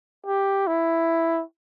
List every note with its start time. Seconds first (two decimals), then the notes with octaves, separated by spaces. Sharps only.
0.26 G4
0.67 E4